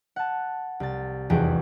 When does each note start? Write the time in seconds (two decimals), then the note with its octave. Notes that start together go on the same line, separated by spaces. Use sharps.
0.16 F#5 A5
0.80 C2 A6
1.30 F1 E2 E3 F#4 G#4 G5